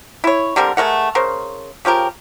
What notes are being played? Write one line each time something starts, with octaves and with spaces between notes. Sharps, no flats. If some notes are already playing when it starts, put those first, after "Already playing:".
E4 C#5
D3 G3 C4 A#4
G#3 A3 A#4 F#5
C#3 A#4 C5
C#3 F3 G4 A#4